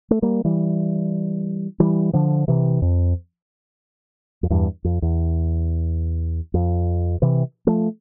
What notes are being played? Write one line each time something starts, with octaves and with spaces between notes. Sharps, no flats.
A3
G3 A#3
E3 G3
E3 G3
D3 F3
C3 E3
F2
F2
E2 G2
F2
E2
F2
C3 E3
F3 A3